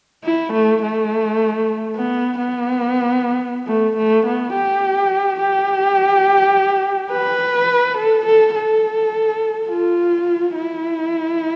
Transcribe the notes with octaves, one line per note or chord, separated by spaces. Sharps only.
E4
A3
A3
B3
B3
A3
A3
B3
G4
G4
B4
A4
A4
A4
F4
E4